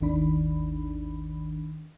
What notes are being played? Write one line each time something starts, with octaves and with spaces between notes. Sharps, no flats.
G#1 D#2 D#3 D4 B5